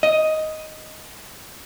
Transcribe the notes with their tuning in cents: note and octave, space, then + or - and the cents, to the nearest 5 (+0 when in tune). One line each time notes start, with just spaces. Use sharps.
D#5 +5